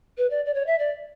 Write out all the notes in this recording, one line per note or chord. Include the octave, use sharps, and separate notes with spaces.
B4
D5
D5
C#5
E5
D5